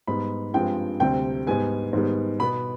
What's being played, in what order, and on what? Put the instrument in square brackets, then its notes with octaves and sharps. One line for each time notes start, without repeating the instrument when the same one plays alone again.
[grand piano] G#2 G3 B3 B5
G2 F3 G#3 C4 G5
D2 C3 G3 C4 G5
G#2 G3 B3 G#5
G#2 D#3 G3 B3
B2 B5
B3